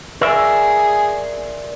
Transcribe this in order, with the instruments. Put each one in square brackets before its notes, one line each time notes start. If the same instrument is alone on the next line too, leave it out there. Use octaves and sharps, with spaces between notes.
[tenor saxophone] G#4 [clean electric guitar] A#4 D5 E5